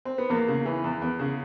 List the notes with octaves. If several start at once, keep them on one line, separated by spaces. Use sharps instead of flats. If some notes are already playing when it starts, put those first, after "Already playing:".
C4
B3
E2 A#3
C#3
E3
E2
E2
C#3